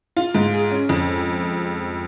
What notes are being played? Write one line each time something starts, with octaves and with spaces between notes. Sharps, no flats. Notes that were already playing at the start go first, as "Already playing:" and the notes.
F4
G#2
G#4
C#4
F2